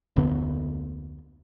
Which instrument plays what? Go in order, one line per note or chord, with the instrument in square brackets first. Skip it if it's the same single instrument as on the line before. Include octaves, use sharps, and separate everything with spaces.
[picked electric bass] F1 D2 D3 B3